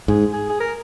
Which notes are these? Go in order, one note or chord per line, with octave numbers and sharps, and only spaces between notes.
G#2 G#4
G#4
G#4
A#4